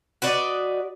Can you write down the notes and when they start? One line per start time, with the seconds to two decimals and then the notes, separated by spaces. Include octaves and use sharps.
0.22 F#4 B4 D5 D#5